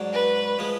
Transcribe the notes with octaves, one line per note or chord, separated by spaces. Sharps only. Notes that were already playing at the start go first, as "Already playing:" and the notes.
Already playing: G#2 F#3 D4
B4
F3 G#3